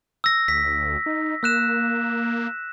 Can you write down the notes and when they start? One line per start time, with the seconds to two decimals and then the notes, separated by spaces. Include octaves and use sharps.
0.24 E6 A#6
0.48 D2 B6
1.06 D#4
1.43 A#3 E6 F#6 E7